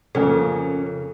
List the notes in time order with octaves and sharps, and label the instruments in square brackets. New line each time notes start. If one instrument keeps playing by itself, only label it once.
[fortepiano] F2 A#3 C#4 [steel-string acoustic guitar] C#3 [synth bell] A4